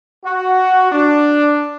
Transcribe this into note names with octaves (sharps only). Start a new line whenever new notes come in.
F#4
D4